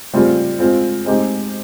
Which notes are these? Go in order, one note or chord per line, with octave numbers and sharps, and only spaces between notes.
G3 C4 F4 G#4
G#3 C4 F4
G#3 C4 D#4 G4